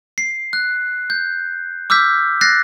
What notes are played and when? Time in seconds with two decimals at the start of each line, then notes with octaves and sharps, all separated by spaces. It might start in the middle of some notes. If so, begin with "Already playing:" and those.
0.18 C7
0.53 F#6
1.10 G6
1.90 D6 E6 F6 G6 B6
2.41 F#6 A6 A#6 C7